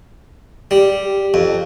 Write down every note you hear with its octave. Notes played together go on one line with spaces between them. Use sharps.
G3
F2